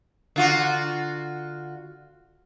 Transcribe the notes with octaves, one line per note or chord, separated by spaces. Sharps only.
D3 F4 F#4